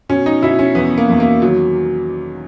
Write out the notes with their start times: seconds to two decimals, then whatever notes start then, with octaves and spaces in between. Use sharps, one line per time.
0.09 B2 C#4
0.26 D#4
0.42 B2 E4
0.59 C#4
0.75 E2 B3
0.98 A#3
1.09 E2
1.20 A#3
1.42 D#3 F#3